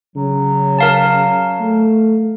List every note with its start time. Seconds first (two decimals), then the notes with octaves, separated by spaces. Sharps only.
0.16 C#3 F#3
0.79 A#4 F5 A5
1.60 A3